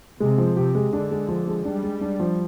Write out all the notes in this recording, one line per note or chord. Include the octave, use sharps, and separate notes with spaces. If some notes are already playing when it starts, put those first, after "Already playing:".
C3 G#3
F3
C3 G4
G#3
D3 D4
G#3
F3
G#3
G3 D4
G#3
D4
F3